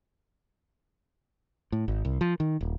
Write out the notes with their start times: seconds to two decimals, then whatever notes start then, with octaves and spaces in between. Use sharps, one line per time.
1.72 A2
1.88 G#1
2.05 C2
2.21 F3
2.40 D#3
2.61 D#1